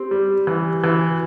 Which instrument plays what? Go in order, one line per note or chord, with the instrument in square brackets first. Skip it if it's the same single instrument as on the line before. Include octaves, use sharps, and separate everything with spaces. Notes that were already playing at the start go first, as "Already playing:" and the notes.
Already playing: [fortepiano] C4 [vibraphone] G4
[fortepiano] G3
[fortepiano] E3 [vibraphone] G4
[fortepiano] E3 [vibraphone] F#4